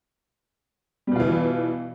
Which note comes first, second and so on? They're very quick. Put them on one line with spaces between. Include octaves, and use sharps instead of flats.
G3 B2 F4 E3